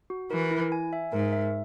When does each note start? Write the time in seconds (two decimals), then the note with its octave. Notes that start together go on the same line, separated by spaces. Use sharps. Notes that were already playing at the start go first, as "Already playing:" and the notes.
0.10 F#4
0.31 E3 A#4
0.51 E4
0.72 G#5
0.93 E5
1.12 G#2 A#4
1.33 E5